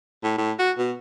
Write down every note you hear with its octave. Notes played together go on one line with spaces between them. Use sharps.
A2
A2
F#4
B2